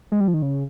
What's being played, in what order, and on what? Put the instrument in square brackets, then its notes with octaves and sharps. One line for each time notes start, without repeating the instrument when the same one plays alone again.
[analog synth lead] G#3
G3
F3
D#3
C#3